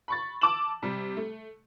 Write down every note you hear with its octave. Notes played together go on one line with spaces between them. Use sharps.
B5 C#6 A6
A5 D6 E6 E7 F#7
C3 G3
A3